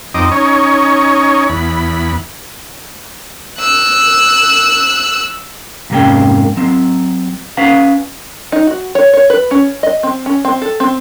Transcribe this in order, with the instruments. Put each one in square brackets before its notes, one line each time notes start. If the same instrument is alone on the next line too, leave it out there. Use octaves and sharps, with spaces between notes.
[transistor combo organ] F2 C4 D#4 D#5 D6
C#4 D#4 C#5
E2 B5
[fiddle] E6 F#6
[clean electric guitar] F2 G#2 C3 A#3 C#4 G5
F#3 C4
C#4 B4 F5 F#5
[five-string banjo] D#4
F#4
C#5
C#5
B4
C#4
D#5
C4
C#4
C4
A4
C4